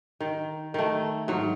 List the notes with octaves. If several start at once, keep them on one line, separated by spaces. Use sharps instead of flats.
D#3
D#3 A3
G#2 F#3